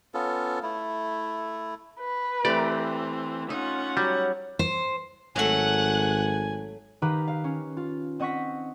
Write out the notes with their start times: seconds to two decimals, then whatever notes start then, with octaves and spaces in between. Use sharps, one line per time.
0.14 B3 C#4 F4 A4
0.63 A3 E4
2.00 B4
2.45 E3 A3 C4 G4 D5
3.50 C#4 D#4 F4 F#5
3.97 F#3 G3
4.59 C5
5.36 G#1 F#3 A3 F#5 G#5 F#6
7.02 D#3 D#4 G4 B4 F5 A#5
7.28 F5
7.44 C#4
7.77 F4
8.19 C4 D#5 F#5 C#6 A#6 B6